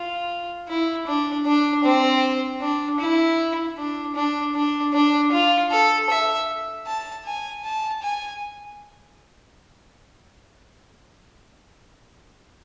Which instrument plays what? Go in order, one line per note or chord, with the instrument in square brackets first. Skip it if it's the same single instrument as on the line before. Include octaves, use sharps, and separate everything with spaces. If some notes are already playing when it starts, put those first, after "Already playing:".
Already playing: [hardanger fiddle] F4
E4
D4
D4
C4
D4
E4
D4
D4
D4
D4
F4
A4
E5
A5
G#5
A5
G#5